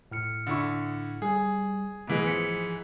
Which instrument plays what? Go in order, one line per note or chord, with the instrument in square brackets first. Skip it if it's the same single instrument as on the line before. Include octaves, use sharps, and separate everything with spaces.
[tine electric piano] A2 F6 C#7
[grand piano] D3 E4 C#6
[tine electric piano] G3 [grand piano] G#4
[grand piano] G#2 E3 G#3 [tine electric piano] A3 B3 B4
[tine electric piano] F3 B6 C#7